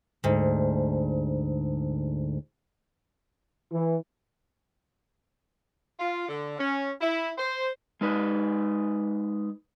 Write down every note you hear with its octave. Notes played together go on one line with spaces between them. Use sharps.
D2 G#2
E3
F4
D3
C#4
E4
C5
G#3 D#4 B4